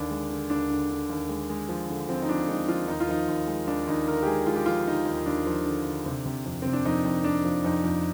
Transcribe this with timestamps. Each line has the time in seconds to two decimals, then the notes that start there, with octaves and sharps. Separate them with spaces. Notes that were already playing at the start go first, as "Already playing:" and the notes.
Already playing: D#2 D3 D4
0.11 G#3
0.30 D3
0.50 D#2 D4
0.70 D3
0.90 D3
1.10 D#2
1.29 G#3
1.50 G#3
1.69 F3
1.89 D3
2.09 F3 C4
2.22 D#4
2.29 F3 D4
2.49 G#3 D#4
2.68 F3 F4
2.88 D#2 D#4
3.00 F4
3.09 F3 D#4
3.28 D#2
3.48 G#3
3.67 D#2 D4
3.87 D#2 D#4
4.07 D3 A#4
4.23 G4
4.27 G#3 G#4
4.46 G#3 F4
4.56 G4
4.66 F3 F4
4.87 D3 D#4
5.06 D#2
5.26 D#2 D4
5.47 F3
5.66 D3
5.86 D3
6.06 C3
6.26 C3
6.46 F2
6.62 C3 C4
6.73 D4
6.85 F2 D#4
7.05 F2
7.24 F2 D4
7.45 F3
7.64 F2 D#4
7.84 F2